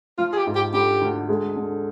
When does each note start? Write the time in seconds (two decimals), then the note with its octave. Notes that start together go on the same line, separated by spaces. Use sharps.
0.18 F3 F4
0.33 G#4
0.37 G4
0.46 G#2
0.55 G4
0.73 D3 G4
1.02 D2
1.29 G#3
1.56 D3